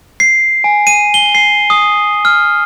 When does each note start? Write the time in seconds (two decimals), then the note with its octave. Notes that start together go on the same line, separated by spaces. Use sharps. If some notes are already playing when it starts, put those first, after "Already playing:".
0.20 C7
0.64 G#5
0.87 D#7
1.14 G7
1.35 C7
1.70 D#6
2.25 F6